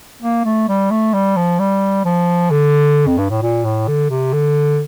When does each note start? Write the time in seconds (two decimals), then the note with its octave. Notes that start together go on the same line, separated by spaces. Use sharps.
0.22 A#3
0.45 A3
0.69 G3
0.91 A3
1.13 G3
1.36 F3
1.59 G3
2.05 F3
2.51 D3
3.07 F2
3.18 G2
3.30 A2
3.42 A#2
3.64 A2
3.87 D3
4.10 C3
4.33 D3